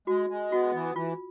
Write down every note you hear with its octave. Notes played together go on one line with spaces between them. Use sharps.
G#3 F#4
G#3
B3 F#4
E3
E3 F4